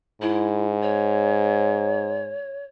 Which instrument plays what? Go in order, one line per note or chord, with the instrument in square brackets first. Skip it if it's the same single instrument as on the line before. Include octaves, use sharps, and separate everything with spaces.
[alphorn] G#2 [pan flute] E4
[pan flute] C#5